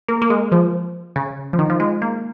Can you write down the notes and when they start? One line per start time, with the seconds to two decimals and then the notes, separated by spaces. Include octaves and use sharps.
0.08 A#3
0.22 A#3
0.30 G#3
0.52 F3
1.16 C#3
1.53 F3
1.59 D#3
1.70 F3
1.80 G#3
2.02 A#3